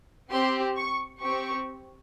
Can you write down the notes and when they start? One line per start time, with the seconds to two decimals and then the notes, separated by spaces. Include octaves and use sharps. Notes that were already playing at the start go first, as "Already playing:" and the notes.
0.30 C4 G4 C6
0.77 C#6
1.22 C4 G4 C#6